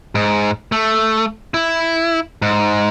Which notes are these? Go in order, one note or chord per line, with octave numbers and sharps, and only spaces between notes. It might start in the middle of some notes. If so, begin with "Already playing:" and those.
G#2
A3
E4
G#2